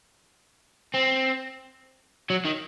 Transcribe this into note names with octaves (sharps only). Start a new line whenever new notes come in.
C4
F#3
D#3